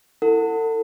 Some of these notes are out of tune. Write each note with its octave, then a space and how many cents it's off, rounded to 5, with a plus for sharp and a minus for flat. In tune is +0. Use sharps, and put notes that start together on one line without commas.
E4 +0 A4 +40 F#5 -5